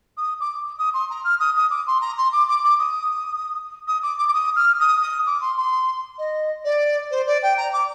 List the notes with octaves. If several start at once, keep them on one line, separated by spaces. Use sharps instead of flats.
D#6
D6
D#6
C6
A#5
F6
D#6
D#6
D6
C6
A#5
C6
D6
D6
D6
D#6
D#6
D6
D6
D6
D#6
F6
D#6
D#6
D6
C6
C6
D#5
D5
C5
D5
G5
A#5
D6